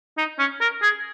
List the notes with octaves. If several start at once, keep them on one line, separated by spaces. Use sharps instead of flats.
D#4
C#4
A#4
G#4